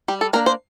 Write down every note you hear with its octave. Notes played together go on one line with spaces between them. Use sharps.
G3 G4
A4
A#3 D4 A#4
C5